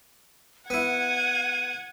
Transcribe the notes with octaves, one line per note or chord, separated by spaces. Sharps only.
B3 E4 F#5 G#6 D#7